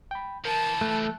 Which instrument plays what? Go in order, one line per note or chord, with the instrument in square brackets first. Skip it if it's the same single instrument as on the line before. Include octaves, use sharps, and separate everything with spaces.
[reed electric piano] G5 B5
[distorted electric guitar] E3 F3 [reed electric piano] A#4 [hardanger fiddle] A5
[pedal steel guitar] A3 [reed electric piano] F#6